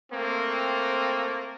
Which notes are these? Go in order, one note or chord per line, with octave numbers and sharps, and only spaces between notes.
A3 A#3 C4